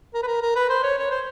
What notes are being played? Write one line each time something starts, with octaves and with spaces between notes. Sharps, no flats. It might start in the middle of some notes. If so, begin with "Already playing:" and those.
A#4
B4
A#4
A#4
B4
C5
C#5
C#5
C5